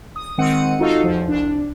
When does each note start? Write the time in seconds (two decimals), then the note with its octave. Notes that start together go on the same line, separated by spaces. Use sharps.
0.16 D#6
0.38 D#3 G#3 C4 F#5 C#7 D#7
0.79 D#4 F4 F#4 A4 D#5 F5
1.03 E2 F3
1.28 C2 D4